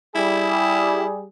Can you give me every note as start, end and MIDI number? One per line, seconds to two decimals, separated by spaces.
0.15 1.26 55
0.15 1.05 64
0.15 1.26 68